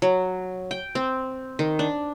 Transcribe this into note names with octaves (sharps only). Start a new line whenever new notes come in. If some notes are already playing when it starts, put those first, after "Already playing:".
F#3
G5
C4
D#3
D4